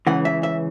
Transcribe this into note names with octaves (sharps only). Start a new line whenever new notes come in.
C#2 C#3 E3 F#5
E5
E5